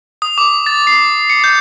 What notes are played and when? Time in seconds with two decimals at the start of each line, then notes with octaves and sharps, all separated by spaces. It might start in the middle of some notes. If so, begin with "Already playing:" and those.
0.22 D#6
0.38 D6
0.66 A6
0.87 C7
1.30 C#7
1.44 G6